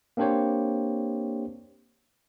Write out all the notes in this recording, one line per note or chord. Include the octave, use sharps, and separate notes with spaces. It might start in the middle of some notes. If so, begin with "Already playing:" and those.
A#3 C4 D4 G4 C5 C#5